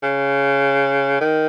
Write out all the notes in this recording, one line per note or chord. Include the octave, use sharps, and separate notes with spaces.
C#3
D#3